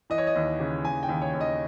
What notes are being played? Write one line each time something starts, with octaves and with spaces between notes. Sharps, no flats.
E3 D#5
C#5
D#5
D#2
C#3
D#2 G#5
G5
D#2
C#5
D#2
D#5